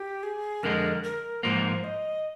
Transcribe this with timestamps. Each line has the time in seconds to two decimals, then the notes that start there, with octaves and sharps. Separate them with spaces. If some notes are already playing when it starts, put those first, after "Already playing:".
Already playing: G4
0.23 G#4
0.63 F2 D3 G#3 A#4
1.04 A#4
1.43 G#2 F3 A#3 C5
1.84 D#5